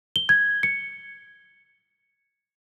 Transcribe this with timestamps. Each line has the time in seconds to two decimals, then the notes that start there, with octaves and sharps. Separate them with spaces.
0.16 G7
0.29 G#6
0.63 C#7